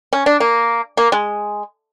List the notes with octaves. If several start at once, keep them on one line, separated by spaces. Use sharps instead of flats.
C#4
D4
A#3
A#3
G#3